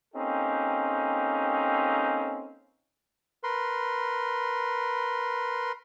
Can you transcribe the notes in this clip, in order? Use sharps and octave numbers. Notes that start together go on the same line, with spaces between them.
A#3 C4 C#4 D#4 G4 A4
A#4 B4 C6